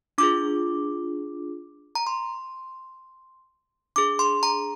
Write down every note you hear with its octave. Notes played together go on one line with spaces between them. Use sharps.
D4 F4 G#4 D6
A#5
C6
D4 G#4 D6
C6
A#5